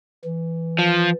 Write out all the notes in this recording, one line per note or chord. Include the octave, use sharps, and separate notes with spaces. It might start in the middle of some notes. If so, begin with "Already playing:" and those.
E3
F3